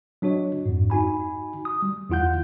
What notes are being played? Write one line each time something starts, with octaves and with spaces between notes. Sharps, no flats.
F#3 D4 F#4 C#5 D#5
F2 G#2
D#4 F#4 G#5 B5
D#6
G3
E2 E4 F4 F#5 G6